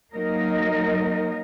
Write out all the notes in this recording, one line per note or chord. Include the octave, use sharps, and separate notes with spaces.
F#3 A#3 D#4 A#4 D#5